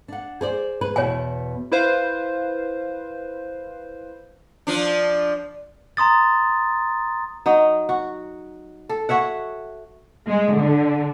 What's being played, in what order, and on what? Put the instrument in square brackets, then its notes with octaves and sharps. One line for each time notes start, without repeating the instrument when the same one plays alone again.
[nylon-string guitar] D4 F#5
G#4 C5 D5
G#4 B4
[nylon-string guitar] E2 B2 [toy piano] C#5 G#5
[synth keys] E4 B4 C5 F5
[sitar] F3 D4
[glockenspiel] A#5 C6 D#6 A6
[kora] F#3 D#4 D#5
F#4
A4
F#4 C#5 E5 F#5
[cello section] G#3
D3